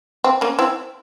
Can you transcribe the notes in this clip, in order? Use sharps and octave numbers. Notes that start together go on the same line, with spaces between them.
C4
A#3 C#4
C4 E4